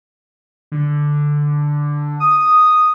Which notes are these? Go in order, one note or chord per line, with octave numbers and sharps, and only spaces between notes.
D3
D#6